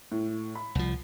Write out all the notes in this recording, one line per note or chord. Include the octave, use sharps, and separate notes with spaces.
A2
B5
C2 F3